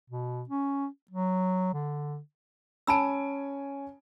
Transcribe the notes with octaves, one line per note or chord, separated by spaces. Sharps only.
B2
C#4
F#3
D3
C#4 G#5 A5 B5 E6 D7